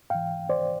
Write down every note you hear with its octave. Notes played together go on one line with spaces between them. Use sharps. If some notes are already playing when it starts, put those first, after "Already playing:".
G#2 E3 F5 G5
C5 D5